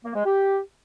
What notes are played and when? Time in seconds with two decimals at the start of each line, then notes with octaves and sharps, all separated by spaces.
0.05 A#3
0.15 G#3
0.25 G4